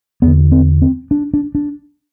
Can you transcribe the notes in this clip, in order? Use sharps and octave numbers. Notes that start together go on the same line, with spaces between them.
E2 D3 B3
C4
C4
D4
D4
D4